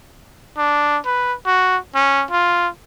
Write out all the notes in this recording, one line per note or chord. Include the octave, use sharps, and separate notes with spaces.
D4
B4
F#4
C#4
F4